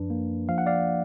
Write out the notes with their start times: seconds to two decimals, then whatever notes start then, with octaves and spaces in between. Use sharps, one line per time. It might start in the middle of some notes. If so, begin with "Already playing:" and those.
Already playing: F#2 F3 D4 B4
0.10 A#3
0.49 F3 F5
0.58 F#5
0.67 D5 F5